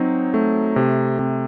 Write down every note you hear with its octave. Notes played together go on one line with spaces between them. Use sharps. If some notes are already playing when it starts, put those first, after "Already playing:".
Already playing: F#3 C4 D#4
A3
C3
C3